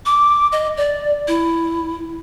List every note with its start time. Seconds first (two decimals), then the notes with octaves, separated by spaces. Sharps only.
0.06 D6
0.52 D#5
0.77 D5
1.28 E4